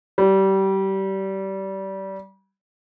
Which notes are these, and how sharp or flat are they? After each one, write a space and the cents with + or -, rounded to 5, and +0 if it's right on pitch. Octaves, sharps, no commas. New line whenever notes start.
G3 -25